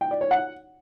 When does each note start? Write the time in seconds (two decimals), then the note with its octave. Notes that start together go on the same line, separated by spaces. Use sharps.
0.01 G5
0.11 D5
0.21 C#5
0.31 F#5